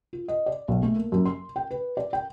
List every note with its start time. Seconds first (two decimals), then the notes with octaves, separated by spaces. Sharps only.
0.13 F4
0.28 D#5
0.46 D5
0.68 B1
0.83 A3
0.96 A#3
1.12 F#2
1.26 C6
1.56 G5
1.71 B4
1.97 D5
2.13 G5